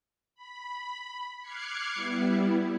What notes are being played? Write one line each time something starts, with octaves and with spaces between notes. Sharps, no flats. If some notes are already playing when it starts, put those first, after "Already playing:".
B5
D6 F6 F#6 G#6 C7 C#7
G3 B3 E4